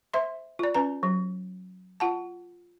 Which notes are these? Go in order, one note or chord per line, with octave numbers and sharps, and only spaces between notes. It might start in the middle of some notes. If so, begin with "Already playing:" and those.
C5 E5 C6
F4 D5
C#4 B4 A#5
F#3
F4 F#5 A5